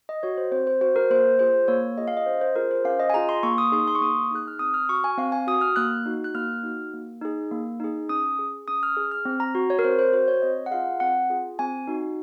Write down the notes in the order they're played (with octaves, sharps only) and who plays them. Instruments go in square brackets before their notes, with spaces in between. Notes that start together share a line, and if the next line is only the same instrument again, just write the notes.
[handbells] D#5
F#4 C#5
C5
C4 C5
C5
F#4 C5
A#4
A#3 C5
F4 G#4 C5
A#3 C#5
F4 G#4 D#5
F5
D#5
C#4 C5
C5
F4 G#4 A#4
C5
C#4 F5
D#5
G#5
F4 G#4 A#5
C6
A#3 C#6
D#6
D#4 G#4 C6
C6
C#6
A#3 D#6
D#4 G#4 F#6
F6
C4 D#6
F6
F#4 C#6
G#5
C4 F5
G#5
F#4 D#6
F6
A#3 F#6
D#4 F#4
F#6
A#3 F6
D#4 F#4
A#3
D#4 G#4
A#3
D#4 G#4
C#4 D#6
G#4
C#4 D#6
F6
G#4
F6
C4
A#5
F#4
C#5
A#4
C4 C5
C5
F#4 C5
C#5
C4 D#5
F#5
F4 G#4 F5
C4 F#5
F4 G#4
C4 G#5
D#4 F#4